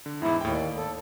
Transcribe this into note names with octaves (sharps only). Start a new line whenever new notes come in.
D3
E2 G#2 E4
D#2 A2 G5
D5
A4